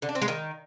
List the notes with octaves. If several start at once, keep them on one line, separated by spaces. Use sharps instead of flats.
D3
D4
C4
G#3
D#3